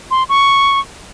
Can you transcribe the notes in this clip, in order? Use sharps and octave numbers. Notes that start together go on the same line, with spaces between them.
C6
C#6